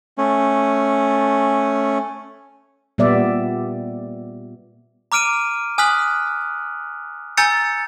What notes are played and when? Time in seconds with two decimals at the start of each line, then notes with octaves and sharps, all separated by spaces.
0.18 A3 C#4
2.98 A#2 G3 B3 D5 E5
5.12 A#5 D6 F6 D7 D#7
5.78 G#5 D#6 F6 F#6 B6 F#7
7.37 G#5 A#5 E6 G6 A6 C#7